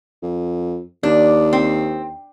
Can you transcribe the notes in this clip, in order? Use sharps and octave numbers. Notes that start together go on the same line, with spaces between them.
F2
D#2 D4
C4